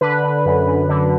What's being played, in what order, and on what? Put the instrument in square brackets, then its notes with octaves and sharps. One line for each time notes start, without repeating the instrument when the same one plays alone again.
[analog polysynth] D3 B4
D3
F#2
F#2
D3